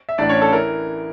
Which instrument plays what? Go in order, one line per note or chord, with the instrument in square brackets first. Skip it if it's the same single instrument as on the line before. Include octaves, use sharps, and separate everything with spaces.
[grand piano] E5
A1 A2 E3 D4 D5
C#4 C#5
A4
E3 A#4